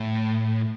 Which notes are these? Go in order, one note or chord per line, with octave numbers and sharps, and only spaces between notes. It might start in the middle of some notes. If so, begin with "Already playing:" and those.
Already playing: A2